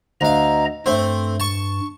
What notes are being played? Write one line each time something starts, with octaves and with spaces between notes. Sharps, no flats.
D2 D#5 F5 A#5
G2 A3 C4
A5 C#6